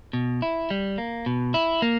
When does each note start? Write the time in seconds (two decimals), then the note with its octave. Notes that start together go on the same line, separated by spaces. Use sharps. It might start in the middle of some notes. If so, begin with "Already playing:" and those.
0.13 B2
0.42 E4
0.71 G3
0.98 A#3
1.26 B2
1.54 E4
1.82 A#3